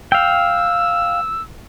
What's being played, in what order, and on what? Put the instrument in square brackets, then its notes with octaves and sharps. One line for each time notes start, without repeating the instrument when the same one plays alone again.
[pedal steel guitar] F5 G5 [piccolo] E6